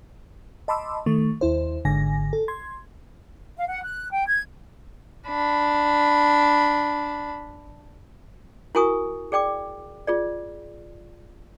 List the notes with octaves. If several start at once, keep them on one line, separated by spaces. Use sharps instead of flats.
D#5 A5 B5 C6 D6 E6
D#3 A3 C#6
D#2 E4 C5
G#1 G#2 D3 G#5 A#6
A4
C6 G#6
F5
F#5
F#6
G5
G#6
D4 B5
E4 F#4 A#4 G#5 C#6 D#6
G#4 D5 G5 D6
F4 G#4 D5